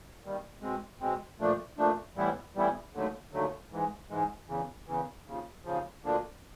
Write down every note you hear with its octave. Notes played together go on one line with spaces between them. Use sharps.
D#2 D#3 G3
B2 G#3 C4
B2 G#3 C4
A#2 F3 A3 D4
A#2 F3 A3 D4
A2 E3 G3 B3 E4
A2 E3 G3 B3 E4
D#2 D3 F#3 A3
D#2 D3 F#3 A3
G#2 E3 G#3
G#2 E3 G#3
E2 C#3 E3
E2 C#3 E3
D#2 C#3 F3
D#2 C#3 F3
D2 D3 F3 A#3 D4